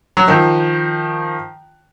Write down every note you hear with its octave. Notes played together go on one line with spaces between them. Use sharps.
F#3
D#3 F3